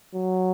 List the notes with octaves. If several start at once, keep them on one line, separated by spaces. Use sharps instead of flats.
F#3